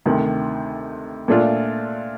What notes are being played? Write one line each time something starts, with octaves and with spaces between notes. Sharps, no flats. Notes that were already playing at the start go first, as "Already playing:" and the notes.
D2 C3 D#3
A#2 A3 D4 F4